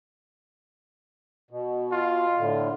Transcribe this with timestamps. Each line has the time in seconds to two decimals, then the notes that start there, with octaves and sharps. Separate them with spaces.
1.51 B2
1.92 F4
2.38 A2 D3